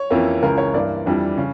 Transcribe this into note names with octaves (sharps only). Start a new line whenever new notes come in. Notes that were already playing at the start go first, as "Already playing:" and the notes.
Already playing: C#5
F2 E3 A#3 C#4 E4
C#2 C#3 E3 A#4
C#5
G2 E3 A#3 D5
F2 E3 G3 D4
C#3